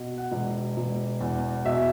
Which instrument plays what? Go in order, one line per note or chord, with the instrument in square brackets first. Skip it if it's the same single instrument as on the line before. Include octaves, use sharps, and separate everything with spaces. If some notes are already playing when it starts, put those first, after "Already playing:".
Already playing: [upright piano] B2
F#5
E1
E1
E2
B2 E5